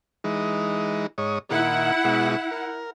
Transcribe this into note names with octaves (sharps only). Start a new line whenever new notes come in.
E3 G#3 D#4
G#2 C#5 D#5
A#2 D#3 E4 F#5
B2 G#3
A#4